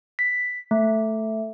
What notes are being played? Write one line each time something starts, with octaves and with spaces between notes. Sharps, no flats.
B6
A3